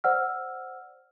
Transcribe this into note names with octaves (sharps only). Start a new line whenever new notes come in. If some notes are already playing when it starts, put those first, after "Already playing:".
C5 D5 F#5 E6 F6